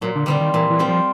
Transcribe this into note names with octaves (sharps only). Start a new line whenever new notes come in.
A#2 F#3
D3
D3 G3 C4 F4
D#3
A#2 E3
E3
G3 C4 F4
F3